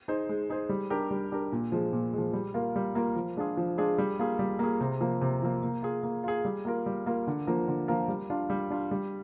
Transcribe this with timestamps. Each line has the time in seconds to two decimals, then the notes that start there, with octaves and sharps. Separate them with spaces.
0.08 D#4 G#4 C5
0.29 G#3
0.50 D#4 G#4 C5
0.69 G3
0.90 D4 G4 A#4
1.11 G3
1.32 D4 G4 A#4
1.52 A#2
1.72 F3 G#3
1.93 A#2
2.13 F3 G#3
2.33 G3
2.54 A#3 F4 A#4
2.76 G3
2.95 A#3 F4 A#4
3.16 F3
3.37 G#3 D4 F4 G#4
3.57 F3
3.78 G#3 D4 F4 G#4
3.98 G3
4.19 A#3 F4 G#4
4.39 G3
4.59 A#3 F4 G#4
4.80 C3
5.01 F3 A#3
5.21 C3
5.42 F3 A#3
5.63 A#3
5.83 F4 G#4
6.03 A#3
6.24 F4 G#4
6.45 G3
6.65 A#3 F4 A#4
6.86 G3
7.06 A#3 F4 A#4
7.27 D3
7.47 F3 A#3 F4 A#4
7.68 D3
7.88 F3 A#3 F4 A#4
8.08 G3
8.30 D4 F4
8.50 G3
8.70 D4 F4
8.91 G3